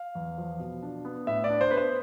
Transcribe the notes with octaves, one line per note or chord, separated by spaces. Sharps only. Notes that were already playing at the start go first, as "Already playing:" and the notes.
Already playing: F5
E2
F3
B2
D4
B3
A2 E5
D5
D4
C5
B3 B4
C5